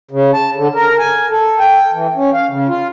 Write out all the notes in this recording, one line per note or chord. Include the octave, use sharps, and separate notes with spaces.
C#3
A5
D3
A#4
G#5
A4
G5
E3
C#4
F5
C#3
F4